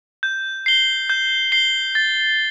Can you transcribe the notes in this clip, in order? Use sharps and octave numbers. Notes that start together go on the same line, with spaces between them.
G6
C7 G7
G6
C7 G7
A6